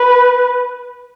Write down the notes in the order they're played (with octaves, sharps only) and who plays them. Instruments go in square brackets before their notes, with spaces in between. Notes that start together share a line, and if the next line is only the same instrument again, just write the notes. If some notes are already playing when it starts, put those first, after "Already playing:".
Already playing: [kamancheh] B4